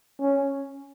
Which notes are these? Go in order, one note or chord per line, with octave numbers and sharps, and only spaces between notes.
C#4